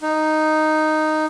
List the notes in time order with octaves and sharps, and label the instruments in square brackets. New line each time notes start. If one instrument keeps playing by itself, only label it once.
[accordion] D#4